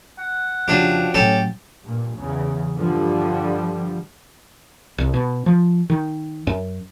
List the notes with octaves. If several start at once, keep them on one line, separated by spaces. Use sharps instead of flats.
F#5
F2 C#3 F3 F#3 D4 G4
A2 F#3 C#4 G4 A4
G2 A#2
E2 C#3
G2 D3 F3 G3
C2
B2
F3
D#3
F#2